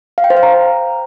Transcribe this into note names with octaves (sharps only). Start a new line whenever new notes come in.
F5
G5
C5
F5
A#5